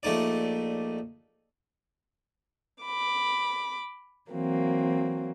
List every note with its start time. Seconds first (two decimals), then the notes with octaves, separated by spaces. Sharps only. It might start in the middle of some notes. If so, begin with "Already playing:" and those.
0.03 A#1 A3 D#4 D5
2.84 B5 D6
4.30 E3 F#3 A#3 C4